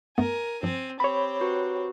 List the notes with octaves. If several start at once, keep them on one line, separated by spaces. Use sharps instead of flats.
G2 A3 B3 A#4 G#5
G2 F3 C4 G#5
C4 G4 C#5 B5
F#4 B4 A#5